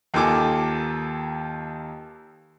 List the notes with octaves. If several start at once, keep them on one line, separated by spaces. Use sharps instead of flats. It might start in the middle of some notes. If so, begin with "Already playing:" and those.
D#2 D#3 F4 A4 G#5 D6